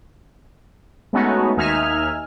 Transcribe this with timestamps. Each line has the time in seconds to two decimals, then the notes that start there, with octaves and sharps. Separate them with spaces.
1.13 G#3 A3 B3 C#4 D#4 F#4
1.57 D#2 D#4 E5 G#5 F6